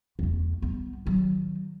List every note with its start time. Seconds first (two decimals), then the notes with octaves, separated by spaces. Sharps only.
0.19 E2 A3
0.62 G3 B3
1.06 D#3 F#3